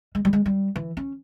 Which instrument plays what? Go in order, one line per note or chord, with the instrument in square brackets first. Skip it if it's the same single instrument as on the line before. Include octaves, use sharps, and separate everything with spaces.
[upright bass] G#3
G3
G#3
G3
E3
C#4